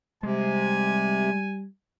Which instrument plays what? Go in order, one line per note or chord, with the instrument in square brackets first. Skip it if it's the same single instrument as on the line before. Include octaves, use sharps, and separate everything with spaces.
[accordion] C3 [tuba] G3 [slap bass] G#3 [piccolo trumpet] G#5